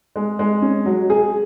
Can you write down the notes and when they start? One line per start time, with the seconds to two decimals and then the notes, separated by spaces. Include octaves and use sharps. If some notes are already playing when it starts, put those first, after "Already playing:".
0.16 G#3
0.39 G#3
0.62 C#4
0.86 F#3
1.10 G#4